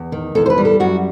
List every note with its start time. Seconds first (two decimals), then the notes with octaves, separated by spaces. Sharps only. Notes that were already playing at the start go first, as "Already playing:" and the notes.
Already playing: E2
0.12 D#3
0.35 E2 A4
0.46 C5
0.50 B4
0.58 G3
0.65 A4
0.80 F#2 F#4